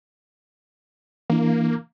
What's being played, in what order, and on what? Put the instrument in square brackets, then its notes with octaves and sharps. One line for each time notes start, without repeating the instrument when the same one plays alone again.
[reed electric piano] E3 D4 E4 [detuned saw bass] A#3